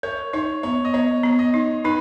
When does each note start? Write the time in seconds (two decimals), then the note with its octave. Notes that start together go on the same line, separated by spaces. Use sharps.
0.03 A#4 C#5
0.33 D#4 C#5
0.63 B3 C#5
0.85 D#5
0.94 B3 C#5
1.23 B3
1.39 D#5
1.54 D#4
1.84 D#4 B4